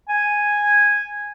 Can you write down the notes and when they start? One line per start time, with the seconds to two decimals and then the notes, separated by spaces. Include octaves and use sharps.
0.09 G#5